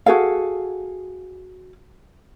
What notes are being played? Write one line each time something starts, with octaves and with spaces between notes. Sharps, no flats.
F#4 G#4 A4 F5